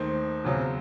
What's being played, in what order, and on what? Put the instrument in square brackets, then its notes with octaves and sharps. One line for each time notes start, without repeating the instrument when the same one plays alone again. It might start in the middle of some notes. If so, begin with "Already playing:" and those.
Already playing: [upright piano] D#2 D#3 A3 [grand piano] C5
[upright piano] E2 C#3 F#3 C4